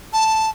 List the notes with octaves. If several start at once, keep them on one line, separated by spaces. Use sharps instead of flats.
A5